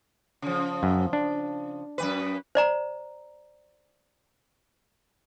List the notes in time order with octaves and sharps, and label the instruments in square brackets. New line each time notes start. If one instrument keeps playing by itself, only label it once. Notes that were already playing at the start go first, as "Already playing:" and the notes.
[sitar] C#3 F3
[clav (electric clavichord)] F#2
D4
[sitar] F#2 D#3 B4
[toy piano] C5 D5 A#5